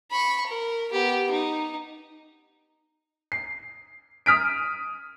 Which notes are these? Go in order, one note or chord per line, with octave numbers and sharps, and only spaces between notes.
B5 C#6
A#4
B3 G4
D#4
C7
D#6 F6 B6 D7